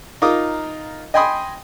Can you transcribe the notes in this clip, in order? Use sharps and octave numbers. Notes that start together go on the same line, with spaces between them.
D#4 F4 A#4 F5 D6 D#6
D#5 G5 G#5 B5 C6 D#6